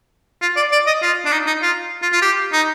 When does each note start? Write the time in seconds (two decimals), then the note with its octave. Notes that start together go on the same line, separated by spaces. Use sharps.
0.42 F4
0.56 D5
0.72 D5
0.87 D#5
1.02 F4
1.26 D4
1.32 D#4
1.47 D#4
1.62 F4
2.02 F4
2.13 F4
2.22 G4
2.53 D#4